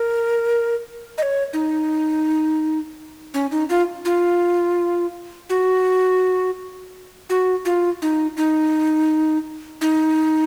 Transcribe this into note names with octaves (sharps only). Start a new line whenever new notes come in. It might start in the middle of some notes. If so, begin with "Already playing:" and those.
Already playing: A#4
D#5
C#5
D#4
C#4
D#4
F4
F4
F#4
F#4
F4
D#4
D#4
D#4